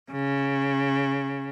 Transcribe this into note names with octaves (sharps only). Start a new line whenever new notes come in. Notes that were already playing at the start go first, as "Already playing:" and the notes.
C#3